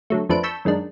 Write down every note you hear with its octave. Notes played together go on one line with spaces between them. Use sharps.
D3 F#3 A3
F2 F3 A3 D4 B4 D7
A5 B5 C#6 E6 G6 B6
F#2 D#3 G#3 D4